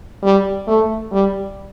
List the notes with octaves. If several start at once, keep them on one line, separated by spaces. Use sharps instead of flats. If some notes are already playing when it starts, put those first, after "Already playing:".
G3
A3
G3